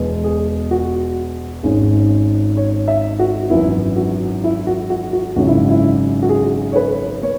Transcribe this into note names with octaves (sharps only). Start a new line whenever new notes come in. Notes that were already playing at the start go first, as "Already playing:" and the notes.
Already playing: E1 E2 B2 G#3 B3
G#4
F#4
G#1 G#2 G#3 C#4
C#5
E5
F#4
G#1 F#2 E3 B3 E4
F#4
E4
F#4
F#4
F#4
G#1 F#2 C#3 G#3 C#4 F#4
E4
E4
F#4
G#4
C#5
B4
B3 C#5